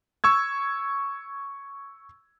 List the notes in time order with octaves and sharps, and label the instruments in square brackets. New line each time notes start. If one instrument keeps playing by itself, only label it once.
[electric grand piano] C#6 E6 G#6